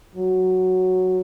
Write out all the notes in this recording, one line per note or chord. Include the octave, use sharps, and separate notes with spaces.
F#3